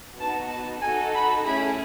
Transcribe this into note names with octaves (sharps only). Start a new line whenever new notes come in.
B3 D#4 F#4 A5
A5
D#4 F#4 A4 G#5
B5
A3 C#4 E4 G#4 B5